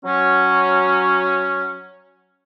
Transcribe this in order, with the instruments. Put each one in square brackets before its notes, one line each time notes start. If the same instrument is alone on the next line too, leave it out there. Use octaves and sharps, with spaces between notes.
[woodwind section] F#3 C#4